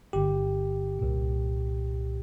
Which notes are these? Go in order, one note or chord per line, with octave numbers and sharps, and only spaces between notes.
G1 G2 D3 G4
C2 A#2